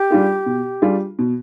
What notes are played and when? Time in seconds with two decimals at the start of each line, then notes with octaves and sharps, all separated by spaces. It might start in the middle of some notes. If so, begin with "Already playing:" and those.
Already playing: G4
0.10 G3 D4 F4 G#4
0.46 B2
0.82 G3 D4 F4 G#4
1.19 B2